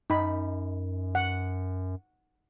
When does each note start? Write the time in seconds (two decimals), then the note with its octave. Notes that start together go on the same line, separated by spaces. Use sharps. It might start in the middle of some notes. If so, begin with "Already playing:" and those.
0.10 F#2 D#4 B5
1.15 F#5